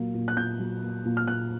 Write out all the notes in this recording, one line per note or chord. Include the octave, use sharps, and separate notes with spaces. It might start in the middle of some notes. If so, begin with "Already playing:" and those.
Already playing: A#2 F#3 A#3
A#2
F#6
A#2 G6
F#3
A#3
A#2
F6
A#2 F#6